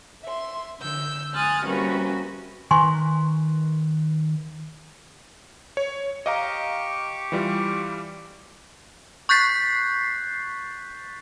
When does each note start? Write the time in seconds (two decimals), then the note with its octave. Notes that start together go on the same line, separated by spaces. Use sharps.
0.23 E5 C6
0.80 D3 E6 G6
1.34 G#5 C6 D#6 F6 F#6 A6
1.66 C3 G3 A#3 C#4 F#4 B4
2.71 D#3 B4 G#5 A#5 C6 C#6
5.77 C#5
6.26 G4 D#5 F5 A#5 C#6 D6
7.32 E3 G3 F4
9.29 C#6 F#6 G6 A6 B6 C7